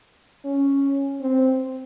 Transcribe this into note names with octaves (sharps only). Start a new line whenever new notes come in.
C#4
C4